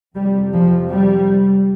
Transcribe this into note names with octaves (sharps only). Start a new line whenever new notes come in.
F2 C3 G3
F3
G3